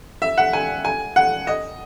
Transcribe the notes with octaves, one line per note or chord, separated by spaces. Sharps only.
E5
F#5
G#5
G#5
F#5
D#5